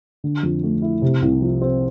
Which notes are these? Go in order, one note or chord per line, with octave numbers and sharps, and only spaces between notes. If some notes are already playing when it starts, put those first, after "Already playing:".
D3
F2
A3
E4
C3
C2
F3
C4